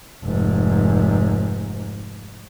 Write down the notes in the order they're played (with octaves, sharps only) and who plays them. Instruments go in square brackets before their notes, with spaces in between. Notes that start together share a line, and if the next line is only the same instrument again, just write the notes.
[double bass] F1 G#2